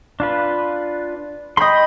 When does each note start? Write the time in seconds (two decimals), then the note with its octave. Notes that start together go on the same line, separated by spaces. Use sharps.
0.20 D4 F4 B4
1.57 D#5 G5 B5 C6